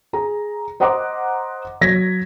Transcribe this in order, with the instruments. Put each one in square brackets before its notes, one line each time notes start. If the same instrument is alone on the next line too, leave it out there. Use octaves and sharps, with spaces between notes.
[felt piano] G#4 A#5
C5 D#5 F#5 A#5 C6 D6
F#3 G#6 A#6 B6